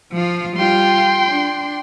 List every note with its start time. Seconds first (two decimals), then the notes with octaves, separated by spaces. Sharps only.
0.12 F3 F4
0.56 G3 F4 G5 C6
1.28 D4